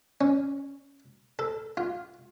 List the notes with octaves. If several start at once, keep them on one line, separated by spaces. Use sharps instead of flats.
C#4
A4
F4